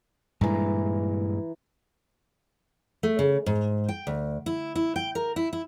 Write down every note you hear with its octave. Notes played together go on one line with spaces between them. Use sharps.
G2 A#2 E3 G#3 A#5
A3
C#3
G#2
G5
D2
E4
E4
G5
A#4
E4
E4